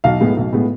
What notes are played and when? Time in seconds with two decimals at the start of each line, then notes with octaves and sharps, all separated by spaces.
0.04 B1 F5
0.20 A2 G#3 B3
0.37 B1
0.53 A2 G#3 B3